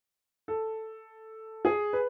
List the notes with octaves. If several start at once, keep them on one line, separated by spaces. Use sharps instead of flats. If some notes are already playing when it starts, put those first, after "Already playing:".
A4
G#4
B4